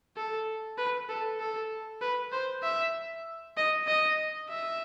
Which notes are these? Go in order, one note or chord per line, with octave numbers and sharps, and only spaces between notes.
A4
B4
A4
A4
B4
C5
E5
D#5
D#5
E5